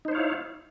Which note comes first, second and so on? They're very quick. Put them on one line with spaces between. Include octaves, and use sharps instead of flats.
D#4 C5 C#5 F5 E4